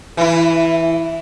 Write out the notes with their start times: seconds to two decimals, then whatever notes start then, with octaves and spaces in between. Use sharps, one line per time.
0.17 E3 E4